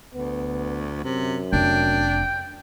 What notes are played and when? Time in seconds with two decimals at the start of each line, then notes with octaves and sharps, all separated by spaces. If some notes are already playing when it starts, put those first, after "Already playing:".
0.14 D2 B3
1.04 F#2 C3
1.53 F1 D4 G5